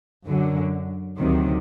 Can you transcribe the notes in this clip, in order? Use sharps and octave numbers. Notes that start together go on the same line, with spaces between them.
F#2 D3 F#3
D2 C3 D#3 F#3